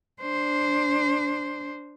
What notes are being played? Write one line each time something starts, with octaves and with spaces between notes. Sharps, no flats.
D4 C5